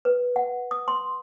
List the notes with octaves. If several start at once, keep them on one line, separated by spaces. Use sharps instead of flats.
B4
F#5
D#6
C6